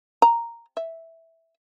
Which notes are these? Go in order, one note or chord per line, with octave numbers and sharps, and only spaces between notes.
A#5
E5